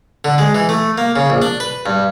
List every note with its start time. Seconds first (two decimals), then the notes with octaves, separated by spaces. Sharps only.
0.25 D3
0.38 G#3
0.55 E3
0.69 A3
0.98 A#3
1.16 C#3
1.30 A#1
1.42 D4
1.60 B4
1.86 G2